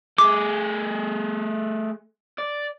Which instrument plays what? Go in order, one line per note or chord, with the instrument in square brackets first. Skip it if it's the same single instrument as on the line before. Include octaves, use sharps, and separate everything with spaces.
[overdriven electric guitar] A3 G#4 [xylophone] D6
[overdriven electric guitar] D5